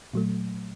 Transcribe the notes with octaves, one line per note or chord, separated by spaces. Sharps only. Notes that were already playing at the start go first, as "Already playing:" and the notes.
A#2 F#3 A3